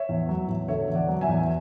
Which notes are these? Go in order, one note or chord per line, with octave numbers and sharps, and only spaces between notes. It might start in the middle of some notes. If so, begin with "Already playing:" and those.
Already playing: C#5 E5
E2
F#3
E2
D3 C#5 E5
E2
D5 F#5
F#3
E5 G#5
E2